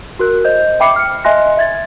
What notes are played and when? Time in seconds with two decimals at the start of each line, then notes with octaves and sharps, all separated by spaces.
0.19 F#4 A#4 F#6
0.45 C5 D#5 G6
0.80 E5 G5 B5 D6 C7 C#7
0.96 F6 C#7
1.24 D#5 E5 G#5 C6 F#6 A#6
1.57 E5 G#6 A6